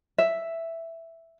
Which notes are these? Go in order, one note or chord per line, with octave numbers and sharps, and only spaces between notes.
E5